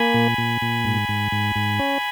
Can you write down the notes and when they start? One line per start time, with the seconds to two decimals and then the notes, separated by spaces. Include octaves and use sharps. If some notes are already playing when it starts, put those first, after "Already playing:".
Already playing: A#3 G#5 B5
0.14 A#2
0.38 A#2
0.62 A#2
0.84 G#2
1.09 G#2
1.32 G#2
1.56 G#2
1.79 C#4